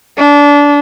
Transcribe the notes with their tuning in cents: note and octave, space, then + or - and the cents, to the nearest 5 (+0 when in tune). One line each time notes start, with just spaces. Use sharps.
D4 -25